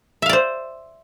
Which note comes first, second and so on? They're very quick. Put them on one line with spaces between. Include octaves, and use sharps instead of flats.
E5 F5 D5 C5